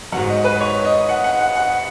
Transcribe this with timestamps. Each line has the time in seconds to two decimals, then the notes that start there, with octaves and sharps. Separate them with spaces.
0.12 F#3 F#5
0.17 G#2
0.29 D#5
0.44 B4
0.60 C#5
0.85 D#5
1.09 F#5
1.24 F#5
1.41 F#5
1.57 F#5